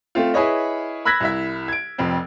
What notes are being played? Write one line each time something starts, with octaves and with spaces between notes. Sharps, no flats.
A3 C4 F4
E4 G#4 B4 C#5 D#5
B5 E6 F#6 G#6 A#6 B6
C2 E4 E5
G#6 D7
F1 F2 C4